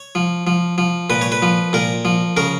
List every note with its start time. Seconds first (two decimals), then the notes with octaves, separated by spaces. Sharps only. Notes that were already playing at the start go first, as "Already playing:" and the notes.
Already playing: C#5
0.15 F3
0.47 F3
0.78 F3
1.10 A#2 B4
1.21 C#5
1.32 B4
1.42 F3
1.73 A#2 A#4
2.05 F3
2.37 C#3 A#4